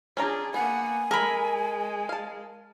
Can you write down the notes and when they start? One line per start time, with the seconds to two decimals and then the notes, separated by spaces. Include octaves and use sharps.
0.17 C#4 D4 F4 G#4 A#5
0.54 A#3 B3 F#5 G#5
1.11 G#3 A4 A#4 B5
2.09 F5 A5